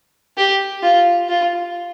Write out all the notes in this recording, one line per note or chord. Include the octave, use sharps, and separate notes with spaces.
G4
F4
F4